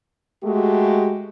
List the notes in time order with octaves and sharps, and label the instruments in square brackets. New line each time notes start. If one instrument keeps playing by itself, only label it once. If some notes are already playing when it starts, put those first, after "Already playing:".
[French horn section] G#3 A3 F#4 G4